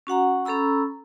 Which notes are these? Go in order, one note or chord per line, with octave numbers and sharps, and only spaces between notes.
C#4 F#4 F#5 A#5
C#4 A4 A#5 B5 E6